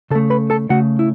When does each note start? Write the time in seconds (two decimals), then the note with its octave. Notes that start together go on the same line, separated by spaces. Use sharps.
0.10 C#3 A4 A5
0.15 A3
0.30 B4 B5
0.50 A4 A5
0.70 C#3 A3 F#4 F#5
0.99 E4